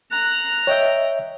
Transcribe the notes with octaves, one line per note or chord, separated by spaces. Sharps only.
A#5 F#6
C#5 D#5 E5 G5